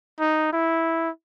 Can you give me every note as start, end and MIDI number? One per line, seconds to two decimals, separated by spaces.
0.20 0.49 63
0.53 1.09 64